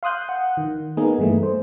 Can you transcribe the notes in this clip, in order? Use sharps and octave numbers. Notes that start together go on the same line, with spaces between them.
F5 C6 D#6 F#6 G6
F#5
D#3
A#3 B3 D#4 G#4
G2 E3 A3
C5